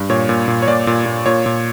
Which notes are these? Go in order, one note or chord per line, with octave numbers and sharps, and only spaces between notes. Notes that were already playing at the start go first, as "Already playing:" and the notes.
Already playing: G2
A#2 C#5
A#2
A#2
C#5
A#2 D5
A#2
A#2
A#2 C#5
A#2